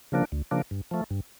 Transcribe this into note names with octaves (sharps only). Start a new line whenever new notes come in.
C#3 F3 A#3 D4
D2
C#3 F3 A#3 D4
G2
F3 A3
G2